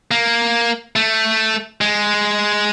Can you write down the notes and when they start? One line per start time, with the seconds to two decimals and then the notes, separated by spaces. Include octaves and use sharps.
0.11 A#3
0.96 A3
1.81 G#3